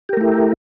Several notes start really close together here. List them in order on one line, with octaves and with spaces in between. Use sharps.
G4 A#4 A3 E4